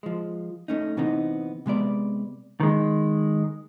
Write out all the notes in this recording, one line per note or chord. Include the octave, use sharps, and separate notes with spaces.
F3 G#3
A3 C#4 D#4
C3 E3 B3 C4 D#4
C3 G#3 B3 D5
D#3 G#3